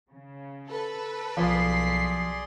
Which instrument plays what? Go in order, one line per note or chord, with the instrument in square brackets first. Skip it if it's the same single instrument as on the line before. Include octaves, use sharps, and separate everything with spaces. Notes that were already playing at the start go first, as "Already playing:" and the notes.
[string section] C#3
[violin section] A4 B4
[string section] B1 B6 C7 [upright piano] F3 [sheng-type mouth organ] G#4 D5 C6